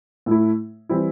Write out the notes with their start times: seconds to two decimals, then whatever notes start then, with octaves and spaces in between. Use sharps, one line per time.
0.26 A2 A3 E4
0.89 E3 G3 C4 E4